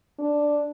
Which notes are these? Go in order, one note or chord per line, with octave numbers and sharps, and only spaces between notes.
D4